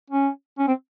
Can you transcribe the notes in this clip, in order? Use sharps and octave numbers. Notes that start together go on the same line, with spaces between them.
C#4
C#4
C4